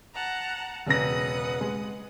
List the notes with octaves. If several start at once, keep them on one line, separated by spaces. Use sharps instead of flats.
F#5 A5 A#5
E1 C#3 B4 F#5 D#6 A#6
G#3